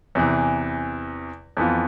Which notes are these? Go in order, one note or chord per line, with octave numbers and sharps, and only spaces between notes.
E2 C3 E3
F2 E3 B3 F4